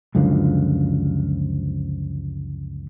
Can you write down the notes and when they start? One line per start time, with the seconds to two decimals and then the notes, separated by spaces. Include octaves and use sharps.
0.15 C#2 F#2 D3 F3